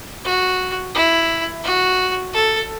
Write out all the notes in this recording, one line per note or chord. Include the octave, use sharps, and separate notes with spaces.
F#4
E4
F#4
A4